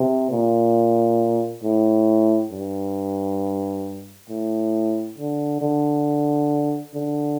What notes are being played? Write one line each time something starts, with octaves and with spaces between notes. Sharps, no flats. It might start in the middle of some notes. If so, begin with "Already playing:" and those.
Already playing: C3
A#2
A2
G2
A2
D3
D3
D3